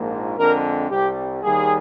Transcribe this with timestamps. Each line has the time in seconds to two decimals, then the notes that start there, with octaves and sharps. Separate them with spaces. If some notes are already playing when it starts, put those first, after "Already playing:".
Already playing: A#1 G#2 F3 A#3
0.37 F2 D3 G#3 C4 A#4
0.90 C2 C3 G3 G4
1.43 D#2 D#3 G3 A#3 G#4